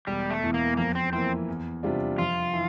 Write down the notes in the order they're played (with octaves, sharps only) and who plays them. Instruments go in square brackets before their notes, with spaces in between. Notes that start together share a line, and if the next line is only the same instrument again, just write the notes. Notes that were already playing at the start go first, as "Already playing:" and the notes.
[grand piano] E1 [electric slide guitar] G3
[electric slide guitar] A3
[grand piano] E2 E3
[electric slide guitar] A#3
[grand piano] F2 [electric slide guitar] A#3
[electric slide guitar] C4
[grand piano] E3 A#3 [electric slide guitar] C4
[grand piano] E2
C3 G3 D4 F4
[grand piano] F2 [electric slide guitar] F4
[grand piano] E3